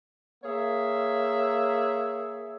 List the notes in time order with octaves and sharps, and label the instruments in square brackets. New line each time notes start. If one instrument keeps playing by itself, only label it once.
[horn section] A#3 G#4 C#5 E5